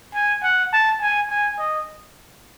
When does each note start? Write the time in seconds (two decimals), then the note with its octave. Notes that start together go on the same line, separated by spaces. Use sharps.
0.14 G#5
0.43 F#5
0.73 A5
1.01 G#5
1.30 G#5
1.59 D#5